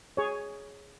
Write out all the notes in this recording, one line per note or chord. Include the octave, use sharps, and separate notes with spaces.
G#4 C#5